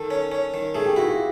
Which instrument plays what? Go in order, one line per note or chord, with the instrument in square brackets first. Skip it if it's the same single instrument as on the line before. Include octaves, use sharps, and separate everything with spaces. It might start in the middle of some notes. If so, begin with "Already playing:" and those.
Already playing: [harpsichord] D#3 [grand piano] A4
[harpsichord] C#4
C#4
D#3
[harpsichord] A3 [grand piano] G#4
[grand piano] G4
[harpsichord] E4 [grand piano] F#4
[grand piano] F4